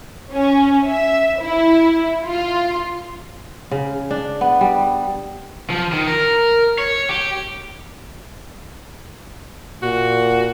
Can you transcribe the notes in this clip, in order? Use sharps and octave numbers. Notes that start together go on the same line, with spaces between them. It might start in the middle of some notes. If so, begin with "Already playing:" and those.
C#4
E5
E4
F4
C#3
D4
B3
G3
F3
D#3
A#4
C#5
G4
A#2 F#4